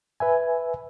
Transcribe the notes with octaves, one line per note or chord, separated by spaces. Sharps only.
B4 E5 G#5